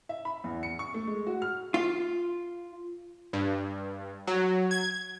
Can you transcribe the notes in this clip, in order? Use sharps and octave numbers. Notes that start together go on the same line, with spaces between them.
E5
B5
E2
C#7
C#6
A3
G#3
F#4
F6
F4
G2
F#3
G#6